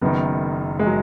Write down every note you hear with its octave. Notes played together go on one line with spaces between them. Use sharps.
F#1 F#2 D#3 B3
G#3
F#3